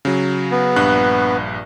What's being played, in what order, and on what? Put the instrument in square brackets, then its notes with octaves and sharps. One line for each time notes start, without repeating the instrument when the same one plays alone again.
[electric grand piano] C#3 F#3
[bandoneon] B3
[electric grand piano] A#1 G2 F#6